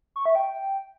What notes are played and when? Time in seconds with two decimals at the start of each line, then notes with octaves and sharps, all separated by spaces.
0.16 C#6
0.26 E5
0.35 G5